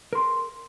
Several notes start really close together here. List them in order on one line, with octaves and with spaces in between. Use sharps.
A#4 C6 G#4